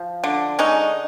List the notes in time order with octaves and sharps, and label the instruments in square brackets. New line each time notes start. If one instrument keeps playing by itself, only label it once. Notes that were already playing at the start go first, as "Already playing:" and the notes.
Already playing: [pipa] F3
D3
G#3 C#4 D#4